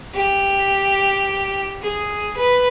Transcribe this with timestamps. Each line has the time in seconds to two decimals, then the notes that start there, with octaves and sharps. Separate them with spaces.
0.14 G4
1.81 G#4
2.37 B4